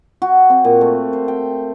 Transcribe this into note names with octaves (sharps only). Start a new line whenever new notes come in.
F#4
C4
A#2
A3
C5
G5